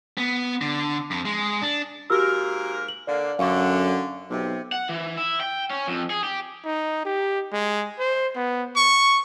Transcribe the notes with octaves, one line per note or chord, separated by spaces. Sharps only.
B3
D3
F2
G#3
D4
G#2 A#3 F#4 G4 A#4 E6
F#7
D3 A#3 D5
F#2 D3 F5 C#6
B1 C3
F#5
E3
E4
G5
C#4
F2
G#4
G4
D#4
G4
G#3
C5
B3
C#6